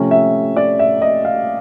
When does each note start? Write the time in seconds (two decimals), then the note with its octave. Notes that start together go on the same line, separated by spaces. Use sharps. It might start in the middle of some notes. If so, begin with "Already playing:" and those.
Already playing: C3 F3 A3 C#4
0.11 E5
0.56 D5
0.79 E5
1.02 D#5
1.25 F5